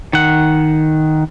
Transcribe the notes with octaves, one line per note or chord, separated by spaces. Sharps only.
D#3 F#5